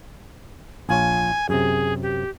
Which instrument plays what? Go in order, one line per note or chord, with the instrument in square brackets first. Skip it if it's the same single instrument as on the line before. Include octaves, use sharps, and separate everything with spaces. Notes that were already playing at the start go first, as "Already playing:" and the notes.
[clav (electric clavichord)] A#1 F4 C#5 [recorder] G#5
[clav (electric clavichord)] F#2 C3 [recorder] G#4
[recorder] G4